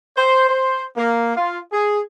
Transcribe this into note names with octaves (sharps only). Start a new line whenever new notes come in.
C5
C5
A#3
F4
G#4